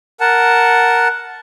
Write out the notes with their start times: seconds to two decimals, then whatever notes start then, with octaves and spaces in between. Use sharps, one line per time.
0.20 A#4 F#5 A5